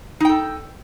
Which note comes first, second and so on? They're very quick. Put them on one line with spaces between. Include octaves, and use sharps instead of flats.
D#4 G5 A4